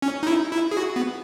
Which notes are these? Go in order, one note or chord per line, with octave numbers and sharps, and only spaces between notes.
C#4
D#4
E4
E4
G#4
F#4
B3